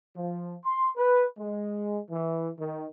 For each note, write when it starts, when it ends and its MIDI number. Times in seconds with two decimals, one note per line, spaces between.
0.16 0.54 53
0.64 0.89 84
0.96 1.25 71
1.37 1.98 56
2.10 2.49 52
2.58 2.86 51